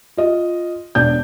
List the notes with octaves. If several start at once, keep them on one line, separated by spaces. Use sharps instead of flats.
F4 D#5
E1 D4 D5 G6